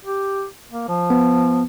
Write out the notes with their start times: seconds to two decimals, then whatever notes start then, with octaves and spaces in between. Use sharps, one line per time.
0.05 G4
0.72 A#3
0.89 F3
1.10 B3